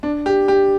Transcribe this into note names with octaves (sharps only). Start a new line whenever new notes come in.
D4
G4
G4